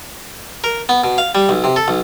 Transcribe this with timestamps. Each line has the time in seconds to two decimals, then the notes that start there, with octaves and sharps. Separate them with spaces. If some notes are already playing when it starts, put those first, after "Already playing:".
0.64 A#4
0.89 B3
1.04 B2
1.18 F5
1.35 G3
1.49 B1
1.64 C3
1.76 A4
1.88 B1